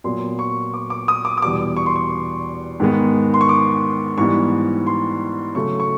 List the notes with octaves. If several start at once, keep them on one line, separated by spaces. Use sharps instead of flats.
A#2 F#3 B3 C6
C#6
D6
D6
D#6
D6
D#6
E2 B2 G3 D6
C#6
C6
C#6
G#2 D#3 G#3 B3
C6
C#6
D6
G#2 E3 G3 B3 C#6
C6
C#3 F#3 A3 C#6
C#6